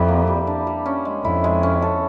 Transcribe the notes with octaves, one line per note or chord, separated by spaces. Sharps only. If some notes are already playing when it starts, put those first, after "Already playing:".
Already playing: F2 G3 E4 G4
A#3
G3
D4
G3
C#4
G#3
F2 E4
G#3
C#4
A4